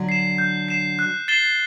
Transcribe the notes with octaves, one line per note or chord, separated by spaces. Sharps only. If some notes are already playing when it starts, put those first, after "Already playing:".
Already playing: D3 F#3
C7 E7
G6
C7 E7
F#6
A6 C7 E7 G7